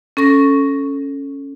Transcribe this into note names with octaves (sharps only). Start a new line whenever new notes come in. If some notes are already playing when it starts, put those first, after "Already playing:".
C#4 A4 C#6 A#6